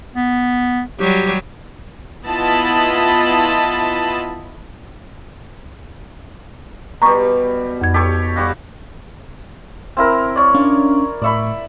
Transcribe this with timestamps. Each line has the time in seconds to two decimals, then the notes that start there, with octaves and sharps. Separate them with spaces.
0.15 B3
1.00 F#3 G3 G4
2.26 B3 E4 F4 D#5 A5 B5
7.02 B2 G3 A#5 C#6
7.81 F2 G#6
7.94 G4 A4 C#5
8.36 G3 F#4 F5
9.97 C4 E4 A#4
10.36 C#5 D5
10.55 C#4 D4 F5
11.22 A2 D5 E5 B5 C#6